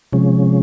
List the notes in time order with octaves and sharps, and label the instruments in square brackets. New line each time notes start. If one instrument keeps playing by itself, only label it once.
[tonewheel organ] C3 F3 G#3 C#4